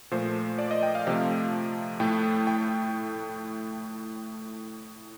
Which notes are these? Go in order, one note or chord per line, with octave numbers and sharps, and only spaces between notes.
A#2 F3 A3 C5
D5
D#5
G5
F5
C3 F3 A3
A2 A3 G5
G5